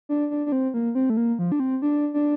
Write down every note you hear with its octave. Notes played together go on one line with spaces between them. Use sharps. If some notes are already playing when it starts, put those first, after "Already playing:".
D4
D4
D4
C4
A#3
C4
A3
A#3
F3
D4
C4
D4
D4